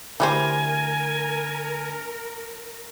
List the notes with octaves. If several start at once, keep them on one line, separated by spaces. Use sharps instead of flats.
D3 E3 G3 A3 A#4 C5 G#5